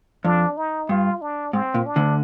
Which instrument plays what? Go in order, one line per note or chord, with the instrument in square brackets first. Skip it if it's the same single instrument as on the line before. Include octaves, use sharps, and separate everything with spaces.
[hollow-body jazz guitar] F2 [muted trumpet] D4
[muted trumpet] D#4
[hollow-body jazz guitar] G2 [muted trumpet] F4
[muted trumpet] D4
[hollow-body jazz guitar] G#2 [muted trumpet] C4
[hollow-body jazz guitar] A#2
[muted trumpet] D4
[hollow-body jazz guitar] D2 D3